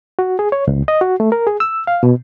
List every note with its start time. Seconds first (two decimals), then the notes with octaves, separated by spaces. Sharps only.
0.19 F#4
0.39 G#4
0.52 C#5
0.67 C#2
0.88 D#5
1.01 F#4
1.20 A3
1.32 A#4
1.47 G#4
1.60 E6
1.87 F5
2.03 B2